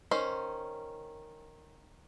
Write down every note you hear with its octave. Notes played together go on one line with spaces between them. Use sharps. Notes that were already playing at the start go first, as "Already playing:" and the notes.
D#3 C#4 C5